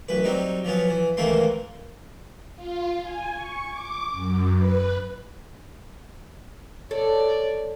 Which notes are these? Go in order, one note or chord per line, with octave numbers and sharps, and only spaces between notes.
A1 F#2 B4
F#3 G3 C4 D#4
F3 F#3 B3 C#4
E3
C#2 D#3 E3 A3 A#3 C6
F4
G#5
C#6
D6
F#2
B4
A4 C#5 D5